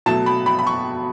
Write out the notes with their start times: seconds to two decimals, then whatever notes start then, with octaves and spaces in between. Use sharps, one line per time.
0.06 B2 F#3 A3 A5
0.26 B5
0.46 B5
0.59 B5
0.67 C#6